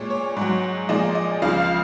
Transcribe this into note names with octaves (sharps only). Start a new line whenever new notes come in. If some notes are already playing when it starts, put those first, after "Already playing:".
Already playing: A#2 G#3 C#5
C#5
G#2 F#3
A#2 F3 G#3 D#5
D#5
C#2 C#3 F3 F5
F5